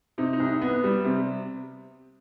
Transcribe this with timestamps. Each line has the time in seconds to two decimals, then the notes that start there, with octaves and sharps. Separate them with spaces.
0.18 C3 D#4
0.33 D#4
0.40 C2
0.62 B3
0.84 G3
1.05 C3